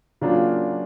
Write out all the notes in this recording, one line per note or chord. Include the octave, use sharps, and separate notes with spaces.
C#3 F#3 A#3 D4 F4